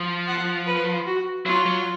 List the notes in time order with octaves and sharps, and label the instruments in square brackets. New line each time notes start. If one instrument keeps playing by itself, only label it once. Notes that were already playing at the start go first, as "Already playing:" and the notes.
Already playing: [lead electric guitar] F3
[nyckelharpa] F#5
B4
F#4
[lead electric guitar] F#3 [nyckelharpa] F4
[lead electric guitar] F#3